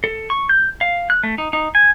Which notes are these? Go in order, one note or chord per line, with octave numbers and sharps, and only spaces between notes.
A4
C#6
G6
F5
F#6
A3
D#4
D#4
G#5